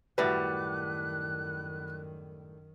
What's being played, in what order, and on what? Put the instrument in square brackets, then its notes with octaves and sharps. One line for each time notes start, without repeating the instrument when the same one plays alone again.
[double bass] F#2 D#3 [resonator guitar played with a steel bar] A2 G3 [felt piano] F#4 B4 [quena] F#6